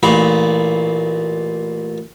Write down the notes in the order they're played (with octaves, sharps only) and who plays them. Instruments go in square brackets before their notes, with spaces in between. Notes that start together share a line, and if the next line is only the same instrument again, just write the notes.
[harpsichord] A1 A#2 B5